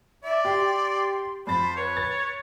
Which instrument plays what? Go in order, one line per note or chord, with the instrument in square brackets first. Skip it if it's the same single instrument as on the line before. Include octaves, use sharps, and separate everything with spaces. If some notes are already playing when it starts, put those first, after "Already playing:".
[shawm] D5 [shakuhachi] E5
[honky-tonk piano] G4 G5 [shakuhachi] C6
[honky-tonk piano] F2 A6 [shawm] C5 [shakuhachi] B5
[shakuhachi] B4 [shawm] C#5
[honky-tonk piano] A6